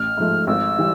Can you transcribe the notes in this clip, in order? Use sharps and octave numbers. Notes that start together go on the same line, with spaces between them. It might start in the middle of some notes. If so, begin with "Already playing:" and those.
Already playing: A1 F6
G#2 F3 A3
G#1 E6
E3 G3